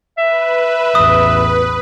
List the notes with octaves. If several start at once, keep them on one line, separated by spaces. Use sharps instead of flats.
B4 E5
A1 E2 D#6